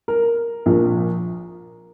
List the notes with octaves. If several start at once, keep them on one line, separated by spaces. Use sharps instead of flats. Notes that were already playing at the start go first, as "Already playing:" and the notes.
A#4
A#1 A#2 F3